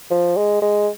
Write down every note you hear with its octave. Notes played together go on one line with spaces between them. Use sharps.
F3
G#3
G#3